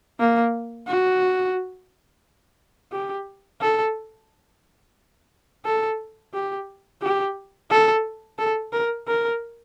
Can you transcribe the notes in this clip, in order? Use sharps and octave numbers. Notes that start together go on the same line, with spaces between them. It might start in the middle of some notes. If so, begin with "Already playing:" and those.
A#3
F#4
G4
A4
A4
G4
G4
A4
A4
A#4
A#4